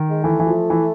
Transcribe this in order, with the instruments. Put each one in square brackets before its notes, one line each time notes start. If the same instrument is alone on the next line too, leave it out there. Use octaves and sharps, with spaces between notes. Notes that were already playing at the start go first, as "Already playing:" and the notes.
Already playing: [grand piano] D#3
[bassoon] G#3
[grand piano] E3 [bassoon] A3
[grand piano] E3
F3
E3